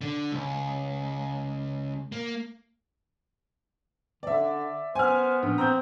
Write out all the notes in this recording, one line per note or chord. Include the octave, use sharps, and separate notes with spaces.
D3
C#2
A#3
D3 D5 E5
B3 C5 G#5 F6
A#1
C4 A#5 G6